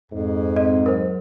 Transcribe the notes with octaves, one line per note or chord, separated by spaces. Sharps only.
F2 G#2
C4 D#5
F#3 A#4 C5